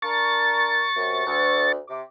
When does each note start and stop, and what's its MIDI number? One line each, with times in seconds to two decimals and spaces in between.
0.02 0.86 62
0.02 0.86 70
0.02 1.72 85
0.02 1.72 93
0.96 1.22 42
0.96 1.22 48
1.25 1.76 38
1.88 2.01 48
1.88 2.01 86